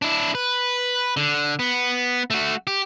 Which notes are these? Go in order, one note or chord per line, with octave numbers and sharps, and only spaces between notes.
D4 E4
B4
D3
B3
A3 F#4
G4